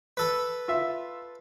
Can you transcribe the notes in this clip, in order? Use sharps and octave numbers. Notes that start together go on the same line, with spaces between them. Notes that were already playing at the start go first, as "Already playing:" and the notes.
A4 B4
F4 E5